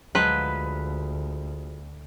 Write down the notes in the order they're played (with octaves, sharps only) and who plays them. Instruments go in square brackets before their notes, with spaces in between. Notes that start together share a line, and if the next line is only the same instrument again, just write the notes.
[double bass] D2 [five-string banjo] F3 F#3 G#3 [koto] B4